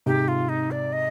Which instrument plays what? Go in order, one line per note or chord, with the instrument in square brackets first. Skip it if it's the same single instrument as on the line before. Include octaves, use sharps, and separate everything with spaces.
[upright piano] G#2 C3 [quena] G4
[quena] F4
D#4
D5
D#5